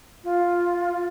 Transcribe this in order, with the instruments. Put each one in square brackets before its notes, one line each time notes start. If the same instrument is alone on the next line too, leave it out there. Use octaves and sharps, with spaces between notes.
[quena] F4